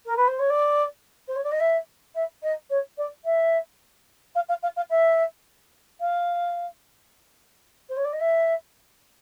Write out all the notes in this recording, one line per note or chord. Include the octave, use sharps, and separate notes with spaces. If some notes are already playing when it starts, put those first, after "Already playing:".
A#4
B4
C5
C#5
D5
C5
C#5
D5
D#5
E5
E5
D#5
C#5
D5
E5
F5
F5
F5
F5
E5
F5
C5
C#5
D5
D#5
E5